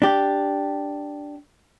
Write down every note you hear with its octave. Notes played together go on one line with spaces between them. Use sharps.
D4 G4